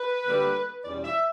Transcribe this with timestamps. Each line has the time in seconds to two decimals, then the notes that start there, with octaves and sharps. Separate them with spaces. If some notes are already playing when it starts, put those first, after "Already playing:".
Already playing: B4
0.24 D2 D3 G3 A#3
0.84 E2 B2 G3 C#4 D5
1.04 E5